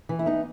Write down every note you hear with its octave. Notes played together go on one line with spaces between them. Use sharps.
E3
E4
B3 D#4